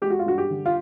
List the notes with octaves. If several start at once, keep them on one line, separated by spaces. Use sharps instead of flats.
G#3 G4
F#4
F4
G2 F#4
G4
D3
F4